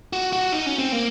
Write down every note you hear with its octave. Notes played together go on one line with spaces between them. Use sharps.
F#4
F#4
D#4
C#4
C4
A#3